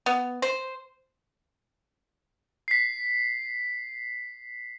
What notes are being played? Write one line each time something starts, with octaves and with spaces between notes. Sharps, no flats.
B3
C5
B6 C7